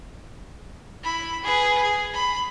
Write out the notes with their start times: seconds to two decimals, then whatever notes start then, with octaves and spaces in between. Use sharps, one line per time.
1.03 E4 B5
1.42 G#4 B4
1.82 G#4
2.14 B5